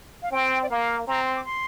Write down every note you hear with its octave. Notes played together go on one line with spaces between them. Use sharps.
F5
C4 G5
D5
A#3 F5
C4 A#5
C6
D6
C6